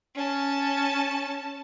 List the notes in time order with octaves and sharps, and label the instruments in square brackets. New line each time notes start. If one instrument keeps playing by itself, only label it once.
[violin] C#4 A5